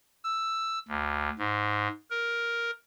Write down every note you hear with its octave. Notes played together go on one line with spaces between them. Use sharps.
E6
D2
G#2
A#4